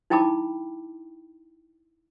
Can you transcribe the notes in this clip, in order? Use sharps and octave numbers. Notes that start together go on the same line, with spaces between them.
D#4 E4 G5 A5 B5 D6